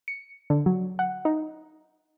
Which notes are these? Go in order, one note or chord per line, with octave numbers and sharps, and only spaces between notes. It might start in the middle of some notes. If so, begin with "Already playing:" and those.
C#7
D3
F#3
F#5
D#4